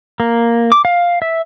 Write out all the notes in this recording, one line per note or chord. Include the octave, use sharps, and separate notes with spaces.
A#3
D6
F5
E5